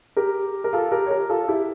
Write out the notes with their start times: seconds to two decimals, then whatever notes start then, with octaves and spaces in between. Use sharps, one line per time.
0.17 G4 A#4
0.64 A#4
0.73 F4 A4
0.92 G4 A#4
1.06 C#5
1.11 G4 A#4
1.30 F4 A4
1.48 E4 G4